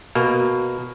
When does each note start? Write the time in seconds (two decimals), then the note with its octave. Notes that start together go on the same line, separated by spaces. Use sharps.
0.15 B2 A#3